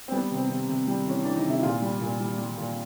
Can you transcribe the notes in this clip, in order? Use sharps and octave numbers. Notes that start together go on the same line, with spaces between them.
C4
G3 B3
C3
C4
C3
C3
G3
E3 C#4
E3 D4
D#4
C3
E4
A#2 F4
G3
A#2
G3
G3
A#2